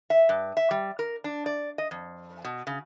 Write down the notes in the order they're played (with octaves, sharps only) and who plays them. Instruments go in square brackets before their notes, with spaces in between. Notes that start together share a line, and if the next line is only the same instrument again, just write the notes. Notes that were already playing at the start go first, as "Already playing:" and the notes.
[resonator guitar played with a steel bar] E5
G2
E5
G3
A#4
D4
D5
D#5
F2
B2
C#3